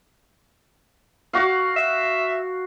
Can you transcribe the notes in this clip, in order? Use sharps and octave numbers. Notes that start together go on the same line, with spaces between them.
F#4 F5
E5